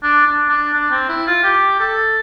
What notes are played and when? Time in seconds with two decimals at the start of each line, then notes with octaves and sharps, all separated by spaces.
0.03 D4
0.26 D4
0.49 D4
0.73 D4
0.91 C4
1.09 E4
1.27 F4
1.43 G4
1.80 A4